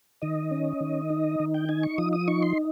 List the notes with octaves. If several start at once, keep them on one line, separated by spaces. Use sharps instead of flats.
D#3 D#5
C#4
D#3
D#4
D#3
G5
D#4 G#5
C#6
F3 D#6
D#6
D#4 C#6
C6